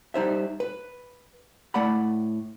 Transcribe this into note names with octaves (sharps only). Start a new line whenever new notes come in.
G3 D#4 C5 E5
B4
A2 A3 D5 F#5 B5